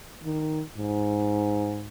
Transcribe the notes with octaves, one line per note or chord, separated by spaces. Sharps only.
D#3
G#2